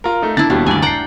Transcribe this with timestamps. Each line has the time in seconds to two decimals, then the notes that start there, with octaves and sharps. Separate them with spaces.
0.04 F4 A#4
0.22 A3 D#4
0.37 D4 E4 A6
0.50 D#2 B2 G3 D4
0.66 D2 G2 D#3 D5 G#5
0.82 F#5 G5 A#5 C7